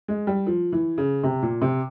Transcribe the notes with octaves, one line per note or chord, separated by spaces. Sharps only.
G#3
G3
F3
E3
C#3
C3
A#2
C3